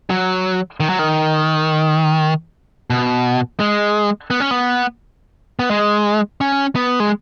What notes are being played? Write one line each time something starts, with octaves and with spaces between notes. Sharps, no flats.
F#3
D#3
F#3
D#3
B2
G#3
B3
C#4
B3
B3
G#3
C#4
B3
G#3